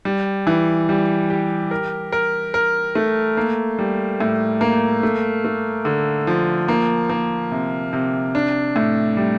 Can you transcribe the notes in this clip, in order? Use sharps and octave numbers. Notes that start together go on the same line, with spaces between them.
G3
E3
G3
G4
A#4
A#4
A#4
A3
A#3
G3
A2
A#3
A3
A3
D3
F3
A#3
A#3
C3
C3
D4
A2
G3